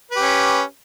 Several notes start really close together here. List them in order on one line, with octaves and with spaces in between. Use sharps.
B4 G4 C#4